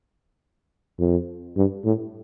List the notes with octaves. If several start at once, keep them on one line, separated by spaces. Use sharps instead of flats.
F2
G2
A2